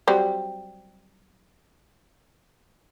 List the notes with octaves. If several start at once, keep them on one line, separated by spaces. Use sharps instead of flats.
F#3 G3 C4